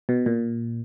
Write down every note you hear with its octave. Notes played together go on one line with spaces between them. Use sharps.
B2
A#2